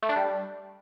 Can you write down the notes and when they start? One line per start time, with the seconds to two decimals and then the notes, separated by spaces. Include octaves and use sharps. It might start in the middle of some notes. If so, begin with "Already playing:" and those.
0.03 A3
0.09 D4
0.16 G3